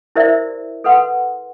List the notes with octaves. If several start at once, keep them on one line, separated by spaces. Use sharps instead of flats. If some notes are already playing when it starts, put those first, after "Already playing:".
E4 G4 A#4 C5 D5 E5
A4 B4 F#5 C6